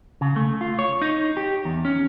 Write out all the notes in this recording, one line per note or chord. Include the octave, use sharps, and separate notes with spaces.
C#3
A3
F4
C#5
D#4
G4
E2
C#4